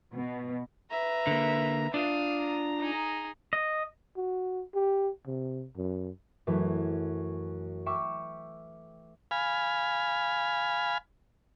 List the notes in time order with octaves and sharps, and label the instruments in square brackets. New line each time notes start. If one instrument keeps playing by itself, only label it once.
[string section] B2
[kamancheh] B4 E5 [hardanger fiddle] A#5
[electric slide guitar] D3 A#3
[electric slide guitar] D4 F4 [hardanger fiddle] F5 D#6
[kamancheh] A#5
[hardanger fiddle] D#4 G#4
[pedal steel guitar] D#5
[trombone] F#4
G4
C3
F#2
[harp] F#2 E3 A3
E5 G5 C#6 D6 F6 E7
[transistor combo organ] F5 G#5 B5